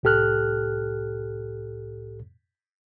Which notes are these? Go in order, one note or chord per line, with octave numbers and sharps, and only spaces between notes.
C2 A2 G4 A4 F6 F#6